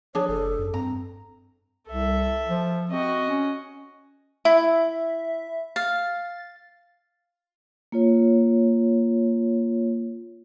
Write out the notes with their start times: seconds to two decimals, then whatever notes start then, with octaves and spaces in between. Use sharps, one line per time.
0.15 F3 D4 G#4 C#5
0.28 F#1 A4
0.58 F#2
0.74 G2 C4 A#5
1.89 C2 A4 E5
2.48 F3
2.91 C4 F#4 D#5
3.27 C#4
4.45 E4 E5
5.76 F5 A6
7.92 A#3 F4 C#5